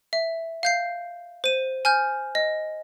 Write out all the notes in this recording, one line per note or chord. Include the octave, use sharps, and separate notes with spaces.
E5
F5 G6 C7
C5 D#7
G#5 F6 G6
D#5